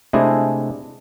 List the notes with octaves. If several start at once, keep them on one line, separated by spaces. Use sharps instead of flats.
C3 G#3 A3 D4 E4 G#4